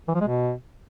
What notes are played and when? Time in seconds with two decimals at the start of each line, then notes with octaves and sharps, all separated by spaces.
0.08 E3
0.15 F3
0.21 G#3
0.27 B2